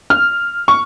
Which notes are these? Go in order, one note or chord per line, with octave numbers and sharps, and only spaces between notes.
F6
C#6